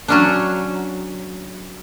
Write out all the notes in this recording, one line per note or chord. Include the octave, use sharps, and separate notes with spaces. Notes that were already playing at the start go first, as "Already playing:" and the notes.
F#3 C#4 D4